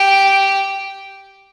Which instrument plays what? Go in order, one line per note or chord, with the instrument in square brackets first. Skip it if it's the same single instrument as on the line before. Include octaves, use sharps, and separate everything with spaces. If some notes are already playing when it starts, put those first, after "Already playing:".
Already playing: [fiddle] G4